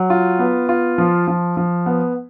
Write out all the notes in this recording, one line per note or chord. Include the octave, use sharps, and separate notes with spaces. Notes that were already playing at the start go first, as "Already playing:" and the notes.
Already playing: F#3
F4
B3
F4
F3
F3
F3
B3